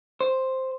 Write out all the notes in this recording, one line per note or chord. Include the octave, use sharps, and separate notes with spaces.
C5